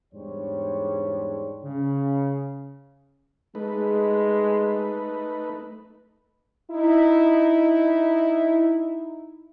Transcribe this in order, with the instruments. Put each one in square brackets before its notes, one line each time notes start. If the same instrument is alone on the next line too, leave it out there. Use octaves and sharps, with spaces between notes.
[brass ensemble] E2 G#2 G3 D4 C5 C#5
C#3
[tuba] G#3 [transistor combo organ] A3 D#4 B4
[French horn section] D#4 E4